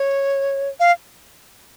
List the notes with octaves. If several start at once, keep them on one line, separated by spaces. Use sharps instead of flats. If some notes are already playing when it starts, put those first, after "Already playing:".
Already playing: C#5
F5